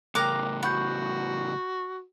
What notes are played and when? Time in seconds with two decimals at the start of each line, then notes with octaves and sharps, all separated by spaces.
0.15 A2 C#3 A#4 G5 A#5 D6 F#6
0.63 F#4 F#5 B5 C#6 G6